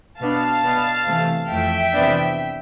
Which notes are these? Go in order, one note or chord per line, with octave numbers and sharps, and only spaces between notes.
B2 B3 D4 F5 A5
B2 B3 D4
C3 E3 A3
F2 E3 A3 E5 G5
C3 E3 B3 D4